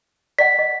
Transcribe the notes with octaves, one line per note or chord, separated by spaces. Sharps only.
D5 D#5 F#5 B6
D#5